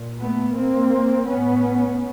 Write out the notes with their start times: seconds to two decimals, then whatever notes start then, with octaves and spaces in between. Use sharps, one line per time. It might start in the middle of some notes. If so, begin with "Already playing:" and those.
Already playing: A#2
0.18 A3 B3
0.55 A#3 C4
1.28 A2 B3 C#4